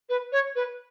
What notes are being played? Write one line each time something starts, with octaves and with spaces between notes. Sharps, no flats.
B4
C#5
B4